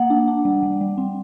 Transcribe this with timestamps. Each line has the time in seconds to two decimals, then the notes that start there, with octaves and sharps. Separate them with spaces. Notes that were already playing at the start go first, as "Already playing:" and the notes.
Already playing: A#3 F#5
0.10 D4
0.28 D4
0.45 G3
0.63 G3
0.81 G3
0.98 C4